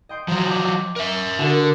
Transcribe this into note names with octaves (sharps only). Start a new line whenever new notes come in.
D#5 G5 C6
F3 F#3
G5 D6
A#4 E5
D3 F#4 G#4 A#4